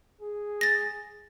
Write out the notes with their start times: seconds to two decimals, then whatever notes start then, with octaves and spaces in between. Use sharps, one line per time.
0.21 G#4
0.61 A6 A#6